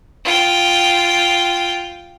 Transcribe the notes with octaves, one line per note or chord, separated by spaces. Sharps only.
F4 G5